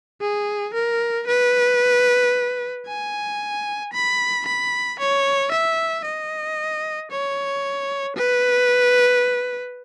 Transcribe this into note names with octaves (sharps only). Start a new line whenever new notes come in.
G#4
A#4
B4
G#5
B5
B5
C#5
E5
D#5
C#5
B4